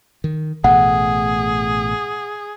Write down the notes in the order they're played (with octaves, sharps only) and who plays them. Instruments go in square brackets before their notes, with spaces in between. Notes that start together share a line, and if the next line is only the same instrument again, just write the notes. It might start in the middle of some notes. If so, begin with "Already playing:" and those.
[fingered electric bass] D#3
[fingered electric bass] A1 B2 A3 [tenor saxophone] G#4 [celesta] F#5